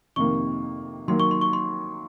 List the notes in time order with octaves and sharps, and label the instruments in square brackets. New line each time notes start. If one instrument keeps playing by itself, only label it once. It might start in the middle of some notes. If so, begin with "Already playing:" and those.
[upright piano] F2 C3 D#3 A#3 [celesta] C#6
[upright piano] D#3 F#3 A#3 [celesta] C6
[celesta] C#6
C6
C#6
C6